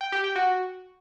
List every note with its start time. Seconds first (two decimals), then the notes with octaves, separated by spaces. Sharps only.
0.01 G5
0.12 G4
0.24 G5
0.36 F#4